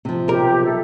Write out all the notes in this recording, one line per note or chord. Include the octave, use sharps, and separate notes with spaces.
C3 F3
B1 G4 A#4
A4 E5